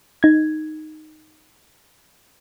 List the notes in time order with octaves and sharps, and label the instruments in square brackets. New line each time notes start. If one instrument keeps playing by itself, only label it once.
[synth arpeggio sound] D#4 G#6